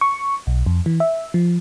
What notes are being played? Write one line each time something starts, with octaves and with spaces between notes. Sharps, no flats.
C#6
B1
F2
E3
E5
F3